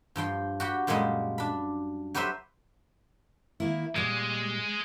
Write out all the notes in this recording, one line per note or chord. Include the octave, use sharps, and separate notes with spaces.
G2 F3 G5 C6
F#4 G4 B5
F#2 A#2 F3 G3 G#3
D4 B5
F#3 G4 B4 C5 E5
D#3 A#3 E4
A#2 G3 G#3